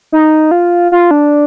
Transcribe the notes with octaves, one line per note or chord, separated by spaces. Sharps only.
D#4
F4
F4
D4